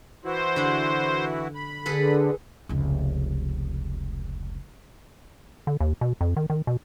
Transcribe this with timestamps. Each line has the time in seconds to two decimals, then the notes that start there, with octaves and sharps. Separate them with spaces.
0.25 E3 E4 F#4 C5
0.56 D3 D4
1.55 B5
1.86 D3 G#4 A4 B4
2.69 F1 C#2
5.67 D3
5.80 D#2
6.01 B2
6.21 F2
6.36 D#3
6.50 D#3
6.67 B2